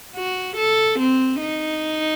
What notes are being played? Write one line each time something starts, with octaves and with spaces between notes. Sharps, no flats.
F#4
A4
C4
D#4